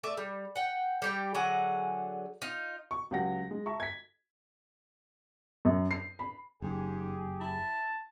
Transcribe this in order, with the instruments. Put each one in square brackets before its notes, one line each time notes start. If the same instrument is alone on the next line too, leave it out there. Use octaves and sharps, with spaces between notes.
[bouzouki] A3 D5 E5
G3
F#5 G5
G3 G4 G5
D3 F#3 G#4 F#5
D#4 F4
[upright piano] C#6
C#2 F#3 G4 F#5 A#6
G#3
E5 A5 A#5 C#6
G#6 B6
[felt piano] F#2
C7
B5
[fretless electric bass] F#1 [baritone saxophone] G#2 [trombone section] G4 G#4
[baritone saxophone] E4 [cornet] A5